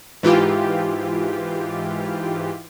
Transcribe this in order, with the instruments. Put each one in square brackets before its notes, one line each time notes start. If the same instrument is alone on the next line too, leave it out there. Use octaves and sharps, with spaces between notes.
[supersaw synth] G#2 E3 F4 G4